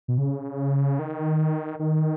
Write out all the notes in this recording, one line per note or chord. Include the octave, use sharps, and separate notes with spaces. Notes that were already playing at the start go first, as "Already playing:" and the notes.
B2
C#3
D#3
D#3